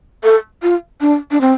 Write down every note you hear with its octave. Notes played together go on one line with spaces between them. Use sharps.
A4
F4
D4
D4
C4